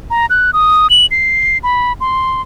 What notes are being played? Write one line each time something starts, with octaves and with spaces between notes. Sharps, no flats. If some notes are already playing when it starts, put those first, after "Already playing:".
A#5
F#6
D#6
F#7
C7
B5
C6